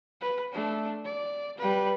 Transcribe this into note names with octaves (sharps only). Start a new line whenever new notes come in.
B4
A3 D4
D5
G3 B4